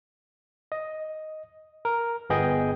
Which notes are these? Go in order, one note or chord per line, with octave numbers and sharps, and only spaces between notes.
D#5
A#4
G1 B3 G#4 D#5 G5